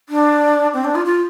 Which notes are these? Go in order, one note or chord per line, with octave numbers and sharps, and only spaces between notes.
D4
C4
D4
F4
F4